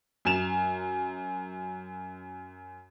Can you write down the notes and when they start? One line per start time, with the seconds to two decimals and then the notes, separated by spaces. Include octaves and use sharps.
0.25 F#2 G#5 E7 F7